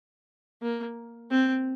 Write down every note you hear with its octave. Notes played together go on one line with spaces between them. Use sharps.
A#3
C4